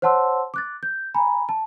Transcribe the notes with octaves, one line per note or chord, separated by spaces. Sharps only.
C5 C#5 F#5 A5 C6 E6
D6 F#6 A6
G6
G#5 A#5 B5
A5